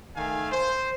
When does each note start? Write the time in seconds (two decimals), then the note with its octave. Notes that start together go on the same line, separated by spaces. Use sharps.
0.16 D#3 A3 F5 G#5
0.52 C5